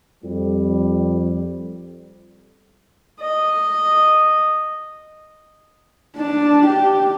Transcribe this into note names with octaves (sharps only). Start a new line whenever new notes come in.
F2 G3
D#5
D4 A5
G4